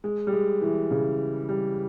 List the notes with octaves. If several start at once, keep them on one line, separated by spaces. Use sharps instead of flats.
G#3
G3
G#3
E3
C#3
G3